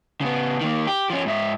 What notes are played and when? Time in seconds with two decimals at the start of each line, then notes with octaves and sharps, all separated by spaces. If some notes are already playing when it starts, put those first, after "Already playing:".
0.21 C#3 B3
0.61 D#3 A#3
0.87 G4
1.10 F3 C#4
1.26 G#2 E5